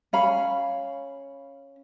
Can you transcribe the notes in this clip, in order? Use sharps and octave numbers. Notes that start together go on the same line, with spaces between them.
C#4 F5 B5